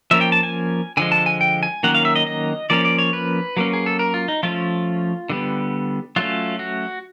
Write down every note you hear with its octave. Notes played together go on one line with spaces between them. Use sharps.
F3 A#3 C#4 E5
G5
A5
G#5
D3 F3 G#3 G#5
A5
G#5
G5
G#5
D#3 F#3 A#3 C#4 F#5
F5
E5
D#5
D#5
F3 A#3 C#4 D5
D5
C#5
B4
F#3 A#3 C#4
G#4
A4
A#4
F4
D#4
F3 A3 C#4 F4
D3 G3 B3
F#3 A3 C#4 F4
F#4